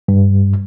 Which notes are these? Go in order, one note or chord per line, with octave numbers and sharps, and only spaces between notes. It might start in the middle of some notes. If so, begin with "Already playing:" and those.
G2